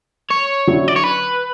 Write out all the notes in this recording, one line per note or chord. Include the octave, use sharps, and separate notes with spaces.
C#5
D3 F#3 C#4 E4
D5
C#5
B4